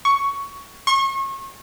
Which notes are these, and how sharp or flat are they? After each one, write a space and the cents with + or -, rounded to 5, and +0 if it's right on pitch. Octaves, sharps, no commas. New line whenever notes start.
C#6 +10
C#6 -35